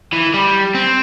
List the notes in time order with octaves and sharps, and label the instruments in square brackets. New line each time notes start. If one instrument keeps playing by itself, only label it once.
[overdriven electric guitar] E3
G3
C4